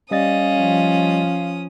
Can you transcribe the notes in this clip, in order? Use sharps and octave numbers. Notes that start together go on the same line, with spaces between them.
G3 C#4 D#5 F5 D#6 A6
F3